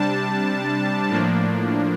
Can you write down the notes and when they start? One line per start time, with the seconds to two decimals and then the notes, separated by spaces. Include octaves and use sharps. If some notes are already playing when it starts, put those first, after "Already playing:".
Already playing: C3 G3 D4 A5
1.09 A2 F3 A#3 D4